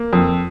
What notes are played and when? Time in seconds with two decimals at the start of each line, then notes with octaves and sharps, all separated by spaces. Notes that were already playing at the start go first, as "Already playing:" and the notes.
Already playing: A#3
0.13 F2